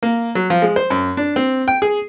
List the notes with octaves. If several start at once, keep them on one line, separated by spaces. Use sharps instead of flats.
A#3
F#3
F3
G#3
C5
F#2
D4
C4
G5
G#4